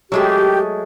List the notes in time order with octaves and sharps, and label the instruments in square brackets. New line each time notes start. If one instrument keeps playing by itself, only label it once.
[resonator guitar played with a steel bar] F#3 G#3 A3 [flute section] G4